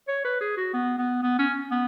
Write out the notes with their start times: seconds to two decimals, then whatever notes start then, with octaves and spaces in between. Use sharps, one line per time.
0.08 C#5
0.24 B4
0.41 G#4
0.57 F#4
0.73 B3
0.98 B3
1.23 B3
1.39 C#4
1.71 B3